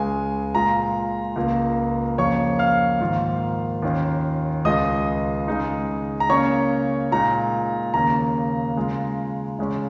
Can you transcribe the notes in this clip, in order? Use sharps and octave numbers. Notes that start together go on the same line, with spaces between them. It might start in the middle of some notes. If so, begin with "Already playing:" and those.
Already playing: C#2 C#3 G#3 G#5
A#2 G#3 F4 A#5
C#2 C#3 A#3 F4
F2 C#3 A#3 C#5 C#6
F5 F6
G#2 D#3 A#3 F4
D#2 D#3 C#4 F4
C#2 C#3 G#3 F4 D#5 D#6
C#3 G#3 D#4
A#5
C#3 A#3 C#4 C#5 C#6
A#2 G#3 D#4 A#5
D#2 C#3 A#3 A#5
C#3 G#3 F4
C#3 G#3 C#4